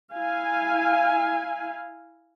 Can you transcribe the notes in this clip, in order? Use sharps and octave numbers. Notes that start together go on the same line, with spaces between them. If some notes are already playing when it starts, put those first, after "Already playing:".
E4 F5 G#5